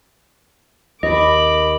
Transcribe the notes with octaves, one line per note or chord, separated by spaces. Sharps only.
D#2 D#5 B5 D6